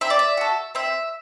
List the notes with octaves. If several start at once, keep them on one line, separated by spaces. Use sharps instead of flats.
C4 E5
D5
E5
F#4 A4
C4 E5